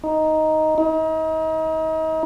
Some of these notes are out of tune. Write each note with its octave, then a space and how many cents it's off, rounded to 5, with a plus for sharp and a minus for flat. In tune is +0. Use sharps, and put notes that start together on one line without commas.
D#4 +5
D#4 +35